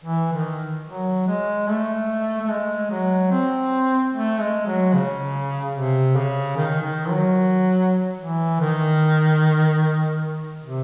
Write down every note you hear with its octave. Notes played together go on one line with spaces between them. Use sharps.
E3
D#3
F#3
G#3
A3
A3
G#3
F#3
C4
A3
G#3
F#3
C#3
C3
C#3
D#3
D#3
F#3
E3
D#3
C3